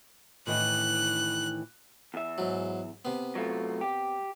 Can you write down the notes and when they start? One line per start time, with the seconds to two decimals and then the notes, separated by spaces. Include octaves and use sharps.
0.47 A2 D#3 E3 F#6
2.14 E2 E5
2.38 G#2 F#3
3.05 C3 B3
3.35 F#3 A3 F4
3.81 G4